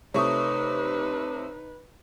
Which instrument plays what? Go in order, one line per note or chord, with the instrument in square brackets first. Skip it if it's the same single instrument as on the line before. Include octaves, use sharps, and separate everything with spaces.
[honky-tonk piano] C3 A3 C#6 [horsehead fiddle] D#4 B4 [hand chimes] C#5 D#6